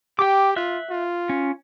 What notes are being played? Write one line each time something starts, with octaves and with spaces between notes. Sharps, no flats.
G4 G5 D6
F4 E5 F#6
F4
C#4